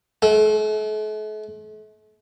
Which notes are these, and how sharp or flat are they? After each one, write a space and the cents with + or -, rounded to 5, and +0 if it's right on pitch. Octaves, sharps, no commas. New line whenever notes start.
A3 -45